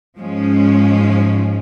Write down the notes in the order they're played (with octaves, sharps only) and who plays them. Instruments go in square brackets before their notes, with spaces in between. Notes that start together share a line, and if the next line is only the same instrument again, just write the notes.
[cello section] G#2 F3 G#3 C#4